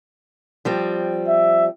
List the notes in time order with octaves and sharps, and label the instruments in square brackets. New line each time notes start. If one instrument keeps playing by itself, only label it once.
[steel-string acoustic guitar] F3 G3 C4
[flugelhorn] E5